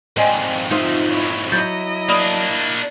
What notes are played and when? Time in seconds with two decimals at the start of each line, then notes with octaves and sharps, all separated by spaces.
0.17 F2 G#2 C4 D5 D#5 G#5
0.71 D#4 F4 C5 E5
1.10 E4 C#5
1.52 F#3 E4 D#5 G6 A6
2.09 A#3 D4 D5 B5 D#6